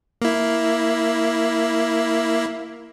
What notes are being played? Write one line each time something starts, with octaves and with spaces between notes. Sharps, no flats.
A#3 E4